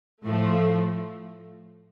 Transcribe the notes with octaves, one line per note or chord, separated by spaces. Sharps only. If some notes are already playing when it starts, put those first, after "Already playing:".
A2 F3 A3